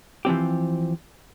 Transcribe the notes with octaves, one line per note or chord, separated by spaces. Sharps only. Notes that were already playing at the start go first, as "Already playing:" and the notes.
E3 F3 C4 G4